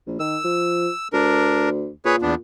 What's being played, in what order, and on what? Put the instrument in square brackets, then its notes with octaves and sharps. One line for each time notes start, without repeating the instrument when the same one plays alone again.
[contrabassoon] A#1
[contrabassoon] D#3 [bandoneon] E6
[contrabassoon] F3
[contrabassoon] D2 [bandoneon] D4 A#4
[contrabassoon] A#2 [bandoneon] G#4 B4 C#5
[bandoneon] E2 B3 D4